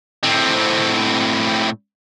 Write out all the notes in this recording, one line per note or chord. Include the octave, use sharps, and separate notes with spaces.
A2 C4